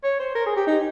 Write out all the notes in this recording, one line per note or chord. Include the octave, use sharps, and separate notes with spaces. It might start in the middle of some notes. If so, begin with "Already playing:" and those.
C#5
C5
A#4
G#4
G4
D#4